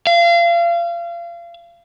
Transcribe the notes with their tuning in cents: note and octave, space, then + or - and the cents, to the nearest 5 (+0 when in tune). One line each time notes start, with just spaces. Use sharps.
F5 -30